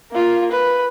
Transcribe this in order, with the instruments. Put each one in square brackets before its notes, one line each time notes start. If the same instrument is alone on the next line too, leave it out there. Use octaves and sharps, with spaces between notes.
[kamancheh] A#3 F4
B4